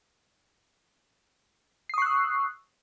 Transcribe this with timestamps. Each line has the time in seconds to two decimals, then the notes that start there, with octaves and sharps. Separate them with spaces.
1.89 C7
1.94 D#6
1.98 C#6
2.02 F#6
2.06 E6